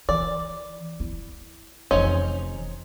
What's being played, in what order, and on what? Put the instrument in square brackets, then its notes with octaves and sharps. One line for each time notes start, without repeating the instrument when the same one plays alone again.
[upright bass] E3 [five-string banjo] D5
[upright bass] E4
[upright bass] F1 E3 [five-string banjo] C#4 D#4 C5